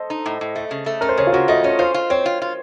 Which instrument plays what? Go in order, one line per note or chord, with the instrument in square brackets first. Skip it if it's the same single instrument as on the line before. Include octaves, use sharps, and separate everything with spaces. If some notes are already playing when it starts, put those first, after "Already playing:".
Already playing: [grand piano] A4 C5 D#5
[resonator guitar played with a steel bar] D#4
A2
A2
A3
C#3
A3
[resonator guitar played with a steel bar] C#4 [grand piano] A#4
[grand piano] C5
[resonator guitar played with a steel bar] C#3 [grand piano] C#5
[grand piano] F4
[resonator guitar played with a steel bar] C#3 [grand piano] F#4
[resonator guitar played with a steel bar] A3 [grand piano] D#5
[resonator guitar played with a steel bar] C#4 [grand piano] C#5
[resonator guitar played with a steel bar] F4 [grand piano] C5
[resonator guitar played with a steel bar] F4
[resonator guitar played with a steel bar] C4 [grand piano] C#5
[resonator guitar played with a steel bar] F4
F4